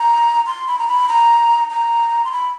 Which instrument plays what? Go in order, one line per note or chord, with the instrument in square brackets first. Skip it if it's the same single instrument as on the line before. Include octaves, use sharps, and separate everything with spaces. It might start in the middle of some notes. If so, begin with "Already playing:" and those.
Already playing: [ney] A#5
C6
B5
A#5
B5
A#5
A#5
C6
B5